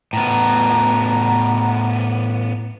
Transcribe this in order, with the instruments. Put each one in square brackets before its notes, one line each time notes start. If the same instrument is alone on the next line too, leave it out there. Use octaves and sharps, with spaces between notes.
[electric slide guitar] A2 B3 [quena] A#5